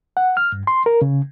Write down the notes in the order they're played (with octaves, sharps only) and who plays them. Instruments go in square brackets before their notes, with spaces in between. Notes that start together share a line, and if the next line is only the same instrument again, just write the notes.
[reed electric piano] F#5
F6
G2
C6
A#4
C#3